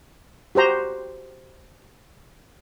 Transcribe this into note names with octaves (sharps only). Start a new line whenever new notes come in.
F#4 G4 C5 A#5